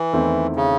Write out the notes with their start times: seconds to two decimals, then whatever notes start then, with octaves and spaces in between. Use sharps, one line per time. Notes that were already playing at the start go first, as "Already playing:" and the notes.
Already playing: E3
0.13 E2 D#3 A3 C4 E4
0.56 C#3